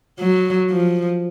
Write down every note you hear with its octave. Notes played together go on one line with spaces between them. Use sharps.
F#3
F3